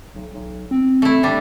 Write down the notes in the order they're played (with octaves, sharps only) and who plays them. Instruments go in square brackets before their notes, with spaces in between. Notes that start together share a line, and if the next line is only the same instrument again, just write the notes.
[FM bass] B1
B1
C4
[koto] A3 E4
G3 D4